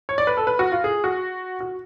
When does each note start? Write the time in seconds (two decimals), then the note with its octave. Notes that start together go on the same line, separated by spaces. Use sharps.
0.09 C#5
0.18 D5
0.27 B4
0.37 A4
0.47 B4
0.59 F#4
0.72 F4
0.84 G#4
1.04 F#4
1.60 F#4